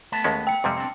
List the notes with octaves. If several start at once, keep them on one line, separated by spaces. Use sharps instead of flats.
A3 B3 A5
D#2 G#3 C#4
G5 C#7
F2 C3 G3 G#3
C4 D4